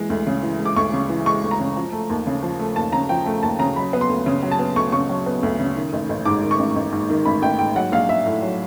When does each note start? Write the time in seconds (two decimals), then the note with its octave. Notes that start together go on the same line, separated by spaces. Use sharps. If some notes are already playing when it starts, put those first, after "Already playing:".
Already playing: E3 G#3
0.10 D2
0.27 C#3
0.43 E3
0.59 G#3
0.65 D6
0.76 D2 C#6
0.93 C#3
1.10 E3
1.26 G#3 C#6
1.43 D2
1.51 A#5
1.60 C#3
1.77 F3
1.92 A3
2.10 D#2
2.27 C#3
2.43 F3
2.60 A3
2.76 D#2 A5
2.93 C#3 A#5
3.09 F3 G5
3.26 A3
3.43 D#2 A5
3.59 C#3 A#5
3.76 F#3 B5
3.93 B3
4.01 C6
4.09 D2
4.26 C#3
4.43 F#3
4.51 A5
4.59 B3
4.76 D2 C#6
4.92 C#3 C#6
5.09 F#3
5.26 B3
5.43 D2
5.59 C#3
5.76 D#3
5.93 A1
6.09 A1
6.26 G#2 D6
6.43 D#3
6.51 C#6
6.59 A1
6.76 A1
6.93 G#2
7.10 D#3
7.25 A1 B5
7.42 A1 G5
7.59 G#2 G5
7.76 F#3 F#5
7.92 A#1 F5
8.09 A#1 E5
8.26 A2
8.42 F#3